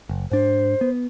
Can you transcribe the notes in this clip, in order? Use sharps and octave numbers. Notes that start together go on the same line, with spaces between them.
F#1
G#2 D4 C5
B3